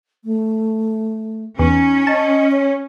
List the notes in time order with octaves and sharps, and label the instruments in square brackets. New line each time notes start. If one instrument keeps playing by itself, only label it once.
[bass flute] A3
[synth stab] E2 [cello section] C#4 [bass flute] D#4
[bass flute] D#5 [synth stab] A5
[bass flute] C#5